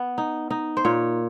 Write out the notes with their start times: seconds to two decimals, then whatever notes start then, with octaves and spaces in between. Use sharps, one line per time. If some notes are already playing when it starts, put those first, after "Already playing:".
Already playing: B3
0.18 D#4
0.51 D#4
0.77 C5
0.85 A#2 C#5